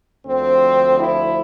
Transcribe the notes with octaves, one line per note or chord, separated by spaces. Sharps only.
D2 D3 F3 C4
E4